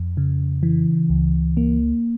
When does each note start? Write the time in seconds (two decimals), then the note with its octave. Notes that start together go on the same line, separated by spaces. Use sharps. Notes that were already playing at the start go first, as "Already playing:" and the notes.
Already playing: F2
0.17 C#3
0.63 E3
1.10 C#2
1.57 A#3